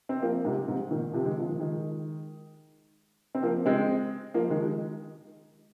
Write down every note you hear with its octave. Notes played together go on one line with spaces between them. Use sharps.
C4
F3 A#3
G#2 C3
G#2 C3
A#2 D#3
C3 F3
D#3 G#3
F3
A#2 D#3
D#3 G#3
C4
F3 A#3
G#3 C4
F3 A#3
D#3 G#3
D#3 G#3